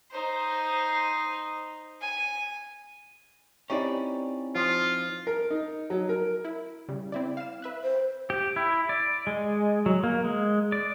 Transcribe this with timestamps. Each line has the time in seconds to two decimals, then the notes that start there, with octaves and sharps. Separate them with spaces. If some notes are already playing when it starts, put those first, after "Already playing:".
0.11 D#4 C5
2.01 G#5
3.70 C4 C#4 D#4 E4 G4 D5
4.55 F3 F4
5.27 A#4
5.50 D#4
5.90 F#3
6.09 A#4
6.45 E4
6.88 C#3 G3
7.12 C4 E4 D5
7.37 F5 E7
7.62 B4 E5 F#6
7.84 C5
8.30 G4
8.56 E4
8.89 D5
9.27 G#3
9.86 F#3
10.04 A#3
10.24 G#3
10.72 D5